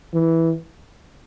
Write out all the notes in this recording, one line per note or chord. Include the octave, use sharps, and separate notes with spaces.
E3